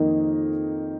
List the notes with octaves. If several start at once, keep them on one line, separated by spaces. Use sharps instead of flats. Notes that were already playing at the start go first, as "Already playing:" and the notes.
Already playing: F2 D#3 A#3 D#4